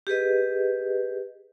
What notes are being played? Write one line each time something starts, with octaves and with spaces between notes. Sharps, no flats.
G4 G#4 B4 D#5